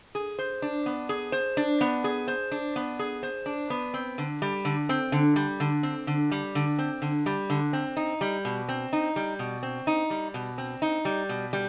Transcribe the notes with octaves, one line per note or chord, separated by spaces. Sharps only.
G#4
C5
D4
B3
G#4
C5
D4
B3
G#4
C5
D4
B3
G#4
C5
D4
B3
C4
D3
G3
D3
C4
D3
G3
D3
C4
D3
G3
D3
C4
D3
G3
D3
C4
D#4
G3
B2
C4
D#4
G3
B2
C4
D#4
G3
B2
C4
D#4
G3
B2
G3